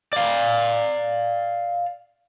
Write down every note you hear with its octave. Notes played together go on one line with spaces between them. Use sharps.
D5 F5